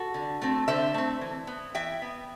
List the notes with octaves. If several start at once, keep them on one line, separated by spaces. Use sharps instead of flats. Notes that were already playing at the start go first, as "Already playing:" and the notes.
Already playing: F#4 A4
D3
A3 C4
D3 C5 E5
A3 C4
E3
B3
E3 E5 G5
B3